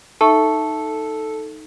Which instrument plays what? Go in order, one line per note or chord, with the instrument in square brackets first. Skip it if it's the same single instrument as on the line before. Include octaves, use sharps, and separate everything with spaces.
[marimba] D#4 E5 C#6 [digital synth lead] A4 [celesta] A5